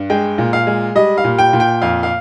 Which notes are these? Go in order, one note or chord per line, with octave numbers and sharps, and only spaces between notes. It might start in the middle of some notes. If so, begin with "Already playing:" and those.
Already playing: G2
G#3 G5
A#2
F5
G#3
G3 D#5
F5
A#2
G5
A#2
G5
F2 F5
F5